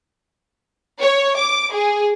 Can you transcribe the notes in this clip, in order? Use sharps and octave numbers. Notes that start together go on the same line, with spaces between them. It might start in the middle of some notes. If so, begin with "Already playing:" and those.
C#5
D6
G#4